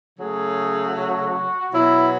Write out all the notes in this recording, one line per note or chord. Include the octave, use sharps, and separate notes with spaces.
C#3 F#3 A3 G#4
F#4
B2 F#3 B3 E4